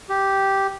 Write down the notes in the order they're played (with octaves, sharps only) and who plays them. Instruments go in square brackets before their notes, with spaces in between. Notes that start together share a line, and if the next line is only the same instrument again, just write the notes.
[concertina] G4